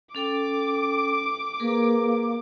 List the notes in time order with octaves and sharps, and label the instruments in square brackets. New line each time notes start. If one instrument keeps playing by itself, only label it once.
[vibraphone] C#4 A4 G5 [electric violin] D6
[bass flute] A#3 [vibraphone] G#4 A#4 B4